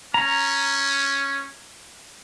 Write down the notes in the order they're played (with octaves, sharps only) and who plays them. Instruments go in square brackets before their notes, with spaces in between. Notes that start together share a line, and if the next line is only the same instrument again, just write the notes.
[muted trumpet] C#4 [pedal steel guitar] A#5